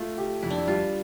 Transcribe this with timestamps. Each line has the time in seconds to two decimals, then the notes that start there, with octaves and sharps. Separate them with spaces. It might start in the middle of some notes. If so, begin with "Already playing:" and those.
Already playing: A3 F4
0.18 G4
0.42 F2 E4
0.50 D4
0.58 E4
0.67 G3 F4